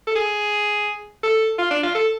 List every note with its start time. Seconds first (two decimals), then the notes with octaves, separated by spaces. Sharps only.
0.07 A4
0.15 G#4
1.23 A4
1.58 F4
1.71 D4
1.83 F4
1.95 A4